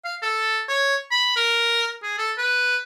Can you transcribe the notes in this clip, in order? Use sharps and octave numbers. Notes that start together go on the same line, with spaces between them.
F5
A4
C#5
B5
A#4
G#4
A4
B4